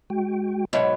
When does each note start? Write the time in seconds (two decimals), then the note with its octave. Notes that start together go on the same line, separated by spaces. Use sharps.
0.10 G#3 F#4 G5
0.73 G#2 B2 F#3 E5 F#5